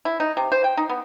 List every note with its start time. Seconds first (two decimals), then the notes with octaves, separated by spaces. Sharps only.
0.05 E4
0.20 D#4
0.37 C3
0.52 C5
0.64 G5
0.77 D#4
0.89 B3